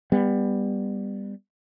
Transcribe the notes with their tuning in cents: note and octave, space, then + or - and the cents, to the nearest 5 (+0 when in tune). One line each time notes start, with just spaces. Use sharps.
G3 +20 B3 +0